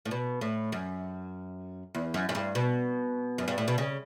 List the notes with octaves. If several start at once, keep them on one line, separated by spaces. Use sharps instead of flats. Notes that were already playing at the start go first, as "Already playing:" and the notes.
A2
B2
A2
F#2
E2
F#2
F#2
G2
B2
F#2
G2
A2
B2
C#3